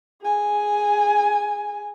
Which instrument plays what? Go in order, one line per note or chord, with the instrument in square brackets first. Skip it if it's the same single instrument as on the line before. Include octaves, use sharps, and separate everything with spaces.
[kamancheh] G#4 G#5